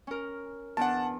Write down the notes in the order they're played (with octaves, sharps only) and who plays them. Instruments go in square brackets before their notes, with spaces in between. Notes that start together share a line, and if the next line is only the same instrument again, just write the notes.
[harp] C#4 A#4
[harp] E2 D4 [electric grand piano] F#5 A5